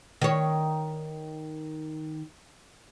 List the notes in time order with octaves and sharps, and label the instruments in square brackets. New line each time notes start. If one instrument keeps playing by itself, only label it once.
[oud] D#3 C#5